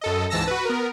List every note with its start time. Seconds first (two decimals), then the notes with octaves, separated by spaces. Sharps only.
0.01 F#2 A4 D#5
0.30 C#2 G#2 E3 A5 E6 A#6
0.47 F#4 B4
0.65 B3 A#4